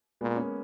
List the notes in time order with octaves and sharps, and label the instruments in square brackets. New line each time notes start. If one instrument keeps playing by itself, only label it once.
[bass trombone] A#2 [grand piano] G#3 B3
[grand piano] A#3 C#4